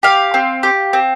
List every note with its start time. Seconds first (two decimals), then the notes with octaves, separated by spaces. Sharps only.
0.03 G4 F5
0.34 C4
0.63 G4
0.93 C4